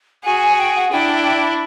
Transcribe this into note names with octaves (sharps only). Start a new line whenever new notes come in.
F#4 G#4 G#5
G#5
G5
F#5
D4 E4 G5